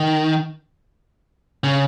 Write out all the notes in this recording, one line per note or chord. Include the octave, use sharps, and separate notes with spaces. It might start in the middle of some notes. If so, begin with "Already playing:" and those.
Already playing: D#3
C#3